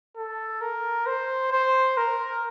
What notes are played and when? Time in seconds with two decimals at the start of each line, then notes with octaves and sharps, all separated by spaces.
0.17 A4
0.61 A#4
1.06 C5
1.52 C5
1.97 A#4